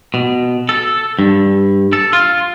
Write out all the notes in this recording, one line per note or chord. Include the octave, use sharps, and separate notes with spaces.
B2
A4
G2
A4
F4